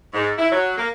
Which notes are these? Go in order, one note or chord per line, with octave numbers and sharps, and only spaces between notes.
G#2
E4
F#3
A#3